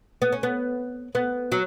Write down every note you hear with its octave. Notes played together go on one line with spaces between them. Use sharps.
B3
C#4
B3
B3
F#3